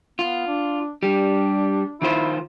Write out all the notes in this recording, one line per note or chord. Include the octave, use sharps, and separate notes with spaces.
B3 F4
D4
G3 D4 G4
D#3 E4 F4 C5